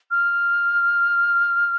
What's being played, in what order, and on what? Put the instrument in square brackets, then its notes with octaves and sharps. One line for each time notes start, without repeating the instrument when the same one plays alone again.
[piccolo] F6